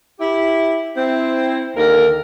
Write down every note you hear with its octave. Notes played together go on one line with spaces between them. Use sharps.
E4 G4
C4 E4
D#2 D3 A#4